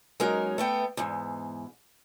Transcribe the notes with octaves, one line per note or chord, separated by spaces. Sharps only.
F#3 G#3 A#3 C#4 D#4 A#4
A3 B3 G5
E2 G#2